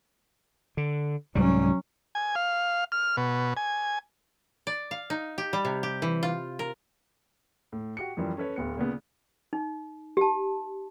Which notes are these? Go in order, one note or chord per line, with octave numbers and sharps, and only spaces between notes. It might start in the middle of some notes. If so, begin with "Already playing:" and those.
D3
C2 G#2 F#3 G3 C#4
G#5
F5
F6
B2
G#5
D5
F5
D#4
G4
G3
C3
G4
E3
F4
A#4
A2
F#4 G4 C#7
F#2 E3 F3 G3
C#4 A4 B4 C#5
D1 B3 C#7
A#2 C#3 B3
D#4
G4 A5